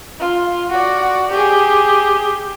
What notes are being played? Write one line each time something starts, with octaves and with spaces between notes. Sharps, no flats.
F4
F#4 D5
G4 G#4